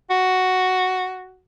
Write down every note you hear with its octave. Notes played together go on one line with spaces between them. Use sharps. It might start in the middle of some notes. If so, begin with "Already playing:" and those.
F#4